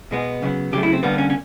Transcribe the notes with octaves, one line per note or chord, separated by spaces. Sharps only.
B2 G#3 B3
C#3 F#3 B3
C#3 F#3 A3 G4
E4
C4
D3 G3 A#3 B3
C#4
C#4